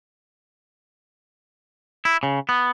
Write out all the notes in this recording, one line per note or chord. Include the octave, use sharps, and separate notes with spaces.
E4
C#3
B3